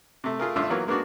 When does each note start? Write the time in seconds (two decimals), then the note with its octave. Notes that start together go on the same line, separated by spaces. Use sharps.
0.24 C3 A3
0.39 A3 F4 G#4 A#4
0.56 G#1 G2 A3 F4 E5 D6
0.70 E3 F#3 A#3 B3 F4
0.87 G#3 A#3 B3 D4 F#4